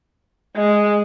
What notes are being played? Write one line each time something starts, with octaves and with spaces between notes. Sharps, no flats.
G#3